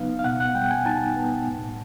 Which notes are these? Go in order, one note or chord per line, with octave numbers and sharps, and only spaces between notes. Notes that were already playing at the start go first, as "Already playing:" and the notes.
Already playing: C#3 F#3 B3 D#4 F5
F5
B2 F#5
F#5
G3 G5
G#5
D#4 A5
B3
A2